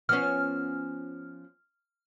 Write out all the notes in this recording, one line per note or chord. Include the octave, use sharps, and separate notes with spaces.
F3 B3 C#4 F6